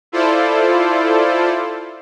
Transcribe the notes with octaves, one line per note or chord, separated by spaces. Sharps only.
E4 F4 A4 C5 D5